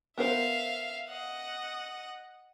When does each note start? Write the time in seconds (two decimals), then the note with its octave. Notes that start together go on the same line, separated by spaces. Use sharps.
0.18 B3 A#4 C5 E5 F5
1.09 D#5 F#5